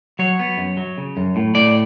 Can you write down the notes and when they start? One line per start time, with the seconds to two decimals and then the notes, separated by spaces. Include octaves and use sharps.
0.19 F#3 C#5
0.40 B3
0.58 F#2
0.77 F#3
0.98 C#3
1.17 F#2
1.36 A2
1.55 A2 D5